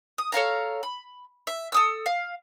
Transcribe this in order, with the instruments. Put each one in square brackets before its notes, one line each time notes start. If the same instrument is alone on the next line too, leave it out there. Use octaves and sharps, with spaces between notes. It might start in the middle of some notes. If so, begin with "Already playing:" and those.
[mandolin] D#6
A4 C#5 F5 A#5
B5
E5
A4 D#6 E6
F5